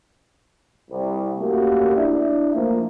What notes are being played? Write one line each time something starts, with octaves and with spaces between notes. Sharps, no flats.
C2
A3 A#3 C#4 F#4 G4 A#4
D4 E4 E5
F3 A3 A#3